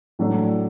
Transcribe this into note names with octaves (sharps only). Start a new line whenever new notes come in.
A2 F#3 A3 D4